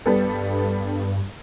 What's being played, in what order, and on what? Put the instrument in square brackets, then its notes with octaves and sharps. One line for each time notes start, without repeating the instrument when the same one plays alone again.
[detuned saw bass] G2 [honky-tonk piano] G3 B3 A4